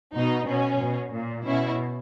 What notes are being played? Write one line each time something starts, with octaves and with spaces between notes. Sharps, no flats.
B2 D#4
B2 C#4
B2
A#2
B2 C#4 E4